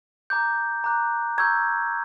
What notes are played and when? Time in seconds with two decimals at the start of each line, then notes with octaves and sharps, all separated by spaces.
0.30 A#5 D6 F#6 G6
0.84 A#5 D6 F#6
1.38 A#5 C#6 E6 G6 G#6